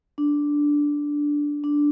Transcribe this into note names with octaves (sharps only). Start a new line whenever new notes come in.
D4
D4